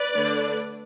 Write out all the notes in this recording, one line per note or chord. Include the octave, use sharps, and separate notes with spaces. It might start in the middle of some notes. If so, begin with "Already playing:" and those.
Already playing: B4 D5
D3 A3 D4